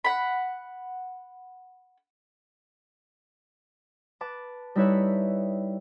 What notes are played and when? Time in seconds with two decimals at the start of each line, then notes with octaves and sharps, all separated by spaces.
0.04 F#5 B5
4.21 B4 A5 D6
4.75 G3 D#4 E4 B4 C#5 E5